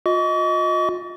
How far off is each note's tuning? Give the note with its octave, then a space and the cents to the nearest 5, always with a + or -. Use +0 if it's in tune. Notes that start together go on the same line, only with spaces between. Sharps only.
F4 +35 D#5 +10 C#6 +45